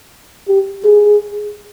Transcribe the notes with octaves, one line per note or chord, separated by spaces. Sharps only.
G4
G#4